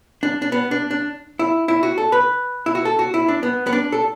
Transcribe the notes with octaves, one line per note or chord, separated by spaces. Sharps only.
D4
D4
B3
D4
D4
E4
E4
F#4
A4
B4
E4
F#4
A4
F#4
E4
D4
B3
B3
D4
A4